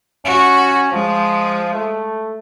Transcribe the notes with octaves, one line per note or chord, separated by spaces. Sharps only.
C#4 F#4
F3 G#3
A3